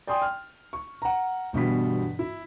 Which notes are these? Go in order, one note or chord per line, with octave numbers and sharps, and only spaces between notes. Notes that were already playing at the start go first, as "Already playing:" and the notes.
D5 G5 G#5 C6 D#6
F6
C#6
F#5 A#5
G1 G2 B2 E3 B6
E4